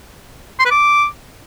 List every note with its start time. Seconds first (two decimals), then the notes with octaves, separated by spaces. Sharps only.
0.59 C6
0.65 B4
0.71 D6